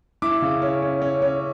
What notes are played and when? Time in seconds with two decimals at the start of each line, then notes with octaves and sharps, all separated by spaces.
0.22 E4 D6
0.42 C#3
0.62 C#4
0.82 C#4
1.02 C#4
1.22 C#4